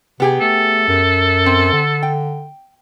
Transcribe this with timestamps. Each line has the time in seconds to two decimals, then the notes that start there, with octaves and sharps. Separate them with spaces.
0.20 C3 B3 G4 G#4
0.41 A3 A4
0.88 F#2
1.46 C4
1.73 D3
2.03 G5